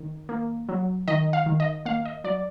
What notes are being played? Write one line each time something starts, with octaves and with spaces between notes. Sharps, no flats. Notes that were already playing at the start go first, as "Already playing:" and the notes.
Already playing: D#3
A#3
F#3
D#3 D#5
F5
D#3
D#5
A#3 F5
D#5
F#3 D5